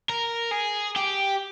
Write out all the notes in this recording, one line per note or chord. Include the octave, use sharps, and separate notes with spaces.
A#4
G#4
G4